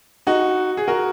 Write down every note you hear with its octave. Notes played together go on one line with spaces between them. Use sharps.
D#4 F#4
G#4
F#4 A#4